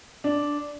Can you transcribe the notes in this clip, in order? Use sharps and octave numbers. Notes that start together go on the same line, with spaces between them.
D4